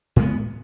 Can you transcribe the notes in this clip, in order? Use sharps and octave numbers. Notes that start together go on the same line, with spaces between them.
A2 G#3 B3